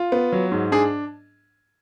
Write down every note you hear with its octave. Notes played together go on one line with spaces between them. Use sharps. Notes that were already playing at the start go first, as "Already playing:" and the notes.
Already playing: F4
B3
F#3
G#2
D4 G#4